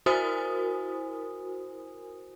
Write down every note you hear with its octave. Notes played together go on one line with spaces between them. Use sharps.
E4 F#4 A#4 C5 G#5 D#6